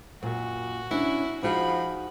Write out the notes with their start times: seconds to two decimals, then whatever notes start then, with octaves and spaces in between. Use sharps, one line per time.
0.23 F#2 A#2 F#4
0.91 C#4 D4 E4 C#5
1.43 F3 D#4 F#4 G#4 B5